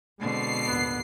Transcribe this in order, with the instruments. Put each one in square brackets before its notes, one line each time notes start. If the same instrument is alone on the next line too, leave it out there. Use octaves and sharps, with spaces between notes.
[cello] B2 D3 [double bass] G#3 C4 [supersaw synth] C7
[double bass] A1 D#2 [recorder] B3